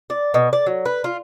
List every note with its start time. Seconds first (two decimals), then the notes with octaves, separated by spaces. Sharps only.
0.10 D5
0.34 B2
0.53 D5
0.66 F#3
0.86 B4
1.04 F4